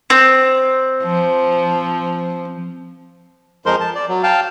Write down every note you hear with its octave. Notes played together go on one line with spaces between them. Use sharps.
C4
F3
F2 F3 G#3 A#4 C5 C6
A5
D5
F#3
F5 G5 A5